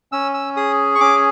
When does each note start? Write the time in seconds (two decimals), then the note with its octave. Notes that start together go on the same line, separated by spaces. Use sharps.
0.12 C#4 E6
0.34 E6
0.57 G#4 D#6
0.95 C#6
1.00 C#4 D6